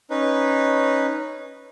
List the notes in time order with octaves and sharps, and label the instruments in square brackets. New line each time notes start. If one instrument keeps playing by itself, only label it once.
[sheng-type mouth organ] C#4 D#4 B4